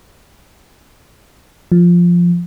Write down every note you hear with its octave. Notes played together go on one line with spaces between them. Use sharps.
F3